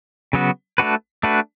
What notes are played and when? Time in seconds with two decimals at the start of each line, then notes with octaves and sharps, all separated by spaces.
0.33 C#3 F#3 B3 F#4
0.78 A3 D4 F#4 B4
1.23 A3 D4 F#4 B4